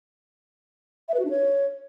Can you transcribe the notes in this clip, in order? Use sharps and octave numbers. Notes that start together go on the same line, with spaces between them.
E5
B4
F#4
D4
C#5